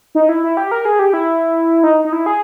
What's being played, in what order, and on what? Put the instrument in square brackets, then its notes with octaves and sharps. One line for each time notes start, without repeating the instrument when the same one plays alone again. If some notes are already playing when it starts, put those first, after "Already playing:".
[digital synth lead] D#4
E4
E4
G4
A#4
G#4
G4
E4
D#4
D#4
E4
G#4